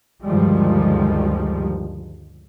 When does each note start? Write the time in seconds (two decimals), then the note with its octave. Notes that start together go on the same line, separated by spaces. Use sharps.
0.24 D2 G2 D#3 F3 G3 G#3